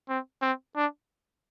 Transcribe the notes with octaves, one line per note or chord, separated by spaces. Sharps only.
C4
C4
D4